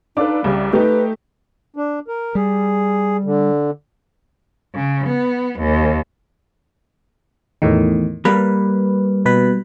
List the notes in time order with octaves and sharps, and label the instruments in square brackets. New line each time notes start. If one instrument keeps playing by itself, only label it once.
[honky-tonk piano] D4 A4 B4 [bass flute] D#4 [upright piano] F5 D6
[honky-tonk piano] C2 C#3 [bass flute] G3
[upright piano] A3 [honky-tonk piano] D#4 G4 [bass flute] B4
[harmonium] D4
A#4
[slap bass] G3 [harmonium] G#4
[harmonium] D3
[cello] C#3
B3
D#2
[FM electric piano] E2 A2 D#3
[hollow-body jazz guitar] G3 A#3 [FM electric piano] B4
[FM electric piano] B2 B4 B5